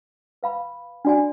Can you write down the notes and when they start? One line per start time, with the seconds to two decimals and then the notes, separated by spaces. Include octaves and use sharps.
0.43 B4 F5 B5
1.05 D4 F#4 D5 G#5